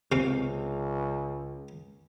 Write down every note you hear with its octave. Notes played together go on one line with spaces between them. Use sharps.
C#2 C3 F5